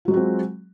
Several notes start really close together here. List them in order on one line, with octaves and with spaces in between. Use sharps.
F4 F#3 G#3 F#4 C4